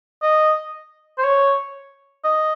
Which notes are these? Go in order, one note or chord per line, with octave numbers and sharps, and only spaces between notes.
D#5
C5
C#5
D#5